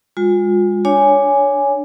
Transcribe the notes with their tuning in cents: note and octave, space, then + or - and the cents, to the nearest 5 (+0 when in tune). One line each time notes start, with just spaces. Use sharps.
G#3 -30 F4 +35
D4 +0 C#5 +15 G#5 +0